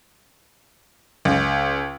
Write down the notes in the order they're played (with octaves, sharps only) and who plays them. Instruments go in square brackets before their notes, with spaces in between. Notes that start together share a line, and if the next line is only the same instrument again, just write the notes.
[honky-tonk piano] C#2